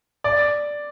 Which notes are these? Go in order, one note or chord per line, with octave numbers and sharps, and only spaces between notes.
D5